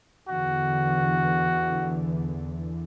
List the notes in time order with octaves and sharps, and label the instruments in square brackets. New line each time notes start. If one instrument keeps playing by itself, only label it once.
[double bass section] E2 D3 E3 [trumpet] F#4